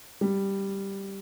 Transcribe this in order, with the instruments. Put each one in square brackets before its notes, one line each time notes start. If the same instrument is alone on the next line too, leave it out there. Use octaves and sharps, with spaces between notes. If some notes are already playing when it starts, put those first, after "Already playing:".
[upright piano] G3